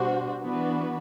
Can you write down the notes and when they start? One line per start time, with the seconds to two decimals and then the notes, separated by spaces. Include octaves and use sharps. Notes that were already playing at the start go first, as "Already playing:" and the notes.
Already playing: B2 G3 D4 F#4 C5
0.41 E3 B3 D4 F#4 B4